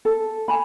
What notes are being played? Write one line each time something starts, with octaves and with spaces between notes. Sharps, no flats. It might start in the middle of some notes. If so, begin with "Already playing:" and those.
A4
G#5 B5